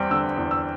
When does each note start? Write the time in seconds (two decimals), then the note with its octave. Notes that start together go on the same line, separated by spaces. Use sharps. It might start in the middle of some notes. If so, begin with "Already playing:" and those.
Already playing: E2 G3 C4 G5
0.11 D3 E6
0.38 E2
0.51 E6